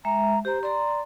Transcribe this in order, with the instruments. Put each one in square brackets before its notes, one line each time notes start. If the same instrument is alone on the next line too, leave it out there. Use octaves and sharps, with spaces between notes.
[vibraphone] G#3 E5 [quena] A#5
[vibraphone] G4 A#5 [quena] C5
[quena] D5 [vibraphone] A#5 C6